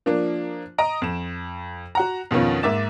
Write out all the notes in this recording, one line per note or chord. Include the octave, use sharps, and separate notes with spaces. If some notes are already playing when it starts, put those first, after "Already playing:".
F3 A#3 D4
D#5 A#5 D#6 D7
F2 E7
F#4 F#5 A#5
F2 B2 D#3 C#4 F4
G#2 A#3 E5 D6 A6 E7